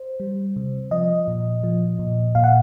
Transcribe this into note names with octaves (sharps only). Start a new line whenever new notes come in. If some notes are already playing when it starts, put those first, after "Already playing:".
Already playing: C5
G3
C3
F3 D#5
A#2
F3
A#2
A#2 F5
F#5